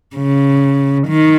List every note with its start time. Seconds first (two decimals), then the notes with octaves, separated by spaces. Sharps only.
0.16 C#3
1.08 D#3